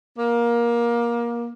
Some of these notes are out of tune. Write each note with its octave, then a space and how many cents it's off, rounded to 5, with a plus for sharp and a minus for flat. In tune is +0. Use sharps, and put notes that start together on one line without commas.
A#3 +20